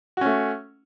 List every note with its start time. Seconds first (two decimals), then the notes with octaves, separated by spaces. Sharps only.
0.17 F#4
0.21 C#4
0.26 A3